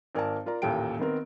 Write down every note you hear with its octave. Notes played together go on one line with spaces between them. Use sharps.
G#1 A#4 D5 G#5 A5
F4 A#4 D5 A#5
A1 D#2 A#2 A4 G5 D7
D#3 B3 C4 A#4